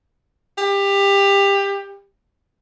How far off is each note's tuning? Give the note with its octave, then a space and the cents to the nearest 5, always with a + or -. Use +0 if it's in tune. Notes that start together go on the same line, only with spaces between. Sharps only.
G4 +20